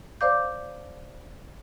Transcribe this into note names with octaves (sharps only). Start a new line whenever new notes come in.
C5 D5 F5 D6 G6